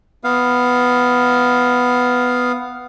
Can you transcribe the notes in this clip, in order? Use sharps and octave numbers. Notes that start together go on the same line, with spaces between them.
B3 F5